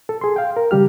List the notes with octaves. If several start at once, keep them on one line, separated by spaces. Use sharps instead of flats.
A4
G#4 C6
F5 G5
A#4
C#3 G3 G4 F6